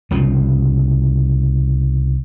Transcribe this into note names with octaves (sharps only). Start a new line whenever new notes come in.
C2 C#3 F3